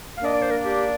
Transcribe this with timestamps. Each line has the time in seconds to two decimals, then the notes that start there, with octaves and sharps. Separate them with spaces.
0.17 F5
0.22 A#3 D4 D#5
0.33 D5
0.42 C5
0.50 A#4
0.64 G4